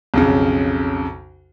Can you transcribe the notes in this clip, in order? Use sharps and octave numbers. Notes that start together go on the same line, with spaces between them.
B1 F2 C#3